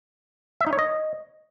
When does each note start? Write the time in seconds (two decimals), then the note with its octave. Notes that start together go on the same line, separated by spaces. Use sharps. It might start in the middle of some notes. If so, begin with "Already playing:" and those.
0.61 E5
0.67 D#4
0.73 C#5
0.79 D#5